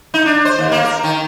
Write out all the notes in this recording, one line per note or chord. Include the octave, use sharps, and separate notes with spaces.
D#4
D4
C5
D#2
A#3
A#4
D#3